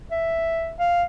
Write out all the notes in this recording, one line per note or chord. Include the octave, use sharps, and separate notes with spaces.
E5
F5